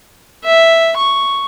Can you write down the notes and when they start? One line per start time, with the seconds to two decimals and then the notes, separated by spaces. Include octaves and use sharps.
0.45 E5
0.97 C#6